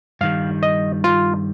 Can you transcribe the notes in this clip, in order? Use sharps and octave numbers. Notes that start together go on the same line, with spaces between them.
G2 D#3 G3 F5
D#5
F4